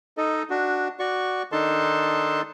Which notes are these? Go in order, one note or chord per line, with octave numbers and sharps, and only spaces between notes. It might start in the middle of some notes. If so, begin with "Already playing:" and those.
D#4 A4 D#5
D4 F#4
F#4 D5 C#6
D#3 D4 D#4 A4 A5 C6